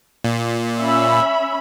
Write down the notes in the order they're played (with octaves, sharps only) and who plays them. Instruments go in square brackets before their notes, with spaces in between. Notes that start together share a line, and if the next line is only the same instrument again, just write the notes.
[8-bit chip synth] A#2
[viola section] C#4 E5 B5